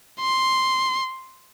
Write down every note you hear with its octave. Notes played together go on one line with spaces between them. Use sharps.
C6